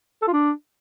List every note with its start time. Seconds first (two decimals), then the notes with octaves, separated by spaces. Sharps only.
0.22 A4
0.28 F4
0.33 D4